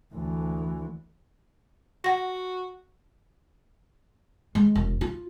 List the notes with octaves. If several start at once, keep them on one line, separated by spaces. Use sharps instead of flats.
D2 E3
F#4 F#5 A#6
G#3
E1
F4